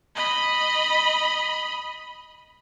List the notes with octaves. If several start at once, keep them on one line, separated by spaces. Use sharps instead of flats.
D#5 B5